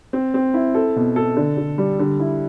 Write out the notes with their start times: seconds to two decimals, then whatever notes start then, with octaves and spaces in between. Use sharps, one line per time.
0.13 C4
0.34 C4
0.54 E4
0.75 A4
0.96 B2
1.16 A4
1.37 D3
1.57 D3
1.78 G3
1.99 D3
2.19 E4